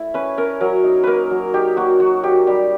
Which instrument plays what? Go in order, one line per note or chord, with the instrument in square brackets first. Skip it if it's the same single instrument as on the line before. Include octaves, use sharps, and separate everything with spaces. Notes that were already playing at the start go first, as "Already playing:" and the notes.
Already playing: [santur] A3 E4
C#4 B4
C#4 A#4
F#3 A#4
D#4
A#3 A#4 B4
F#3
D#4 G4
A#3 F#4
F#3 F#4
D#4 G4
G3 G4